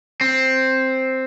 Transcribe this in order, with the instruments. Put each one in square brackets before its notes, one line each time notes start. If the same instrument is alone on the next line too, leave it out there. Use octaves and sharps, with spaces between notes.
[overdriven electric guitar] C4